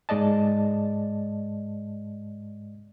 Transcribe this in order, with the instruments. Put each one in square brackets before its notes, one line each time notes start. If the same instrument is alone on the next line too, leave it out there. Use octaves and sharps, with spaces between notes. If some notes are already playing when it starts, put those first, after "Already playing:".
[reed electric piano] G#2 G#3 D5 D#5 A5